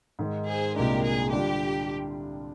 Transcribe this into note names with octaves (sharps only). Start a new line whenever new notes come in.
G#2 D#3 G#3
G#4 C5
C2 A#2 G#3 D4 G4 A#4
G#4
D3 G3 D4 F4 G4